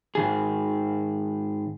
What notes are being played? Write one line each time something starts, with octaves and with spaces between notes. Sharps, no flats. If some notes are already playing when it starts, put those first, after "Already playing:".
G#2 D#3 G#4